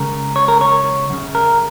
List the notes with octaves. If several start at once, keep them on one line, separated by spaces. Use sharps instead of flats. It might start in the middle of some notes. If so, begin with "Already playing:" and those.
Already playing: C#2 C#3 A#4
C#5
A#4
C#5
F#2 C#3
A#4